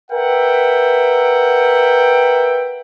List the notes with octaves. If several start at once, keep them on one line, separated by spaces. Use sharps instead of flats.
A#4 B4 E5 F#5 G5